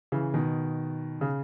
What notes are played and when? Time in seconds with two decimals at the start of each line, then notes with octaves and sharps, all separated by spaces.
0.12 C#3 E3
0.34 B2 D#3
1.21 C#3